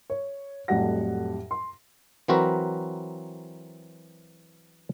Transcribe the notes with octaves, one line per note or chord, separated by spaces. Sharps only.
C#5
F2 A2 F#3 G3 F#5 A#6
C6
E3 F#3 C4 F#4 A#4 B4